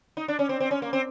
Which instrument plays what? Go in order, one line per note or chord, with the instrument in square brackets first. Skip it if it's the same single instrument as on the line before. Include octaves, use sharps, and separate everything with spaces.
[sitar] D#4
D4
C#4
C4
C4
C#4
A#3
C4